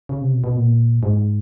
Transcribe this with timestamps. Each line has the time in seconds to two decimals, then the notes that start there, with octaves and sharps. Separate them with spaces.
0.09 C#3
0.21 C3
0.33 B2
0.44 B2
0.55 A#2
1.03 G#2